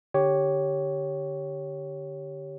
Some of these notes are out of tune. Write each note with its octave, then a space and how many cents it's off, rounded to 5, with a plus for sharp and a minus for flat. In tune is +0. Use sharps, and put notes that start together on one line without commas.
D3 +0 G4 -5 C#5 +0